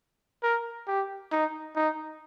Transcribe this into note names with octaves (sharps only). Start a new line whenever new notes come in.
A#4
G4
D#4
D#4